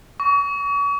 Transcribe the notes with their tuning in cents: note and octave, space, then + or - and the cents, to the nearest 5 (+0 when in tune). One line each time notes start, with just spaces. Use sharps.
C#6 +40